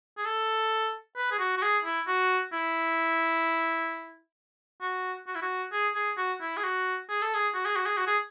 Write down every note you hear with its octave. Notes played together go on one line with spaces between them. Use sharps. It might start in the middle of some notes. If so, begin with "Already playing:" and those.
G#4
A4
B4
G#4
F#4
F#4
G#4
E4
F#4
E4
F#4
F#4
E4
F#4
G#4
G#4
F#4
E4
G#4
F#4
G#4
A4
G#4
F#4
G#4
F#4
G#4
F#4
G#4